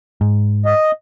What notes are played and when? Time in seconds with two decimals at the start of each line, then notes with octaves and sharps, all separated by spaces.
0.21 G#2
0.66 D#5